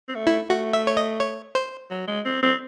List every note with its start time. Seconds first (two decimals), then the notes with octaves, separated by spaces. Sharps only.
0.08 C4
0.15 A3
0.27 E4
0.50 A3 F#4
0.73 E5
0.87 C#5
0.97 D#5
1.20 C#5
1.55 C5
1.90 F#3
2.07 G#3
2.25 C4
2.43 C4